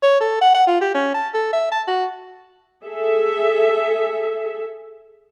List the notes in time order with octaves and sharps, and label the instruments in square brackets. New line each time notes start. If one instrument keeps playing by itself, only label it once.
[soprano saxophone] C#5
A4
F#5
F#5
F4
G4
C#4
A5
A4
E5
A5
F#4
[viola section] G#4 A4 E5